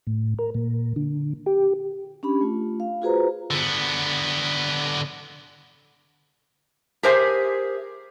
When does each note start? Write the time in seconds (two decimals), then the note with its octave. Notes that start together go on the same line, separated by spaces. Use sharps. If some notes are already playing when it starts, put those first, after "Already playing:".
0.07 A2
0.39 A#4
0.55 A#2
0.96 D3
1.46 G4
2.23 C#4 D4 G4 B5
2.41 A3 F4
2.80 F5
3.02 F4 F#4 G#4 B4 C5 A#5
3.51 D3 B3
7.03 G4 G#4 A#4 C5 E5 G#5